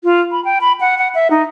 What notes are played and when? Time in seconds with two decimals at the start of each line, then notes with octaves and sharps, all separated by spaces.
0.04 F4
0.32 B5
0.45 G5
0.61 B5
0.80 F#5
0.98 F#5
1.15 E5
1.31 D#4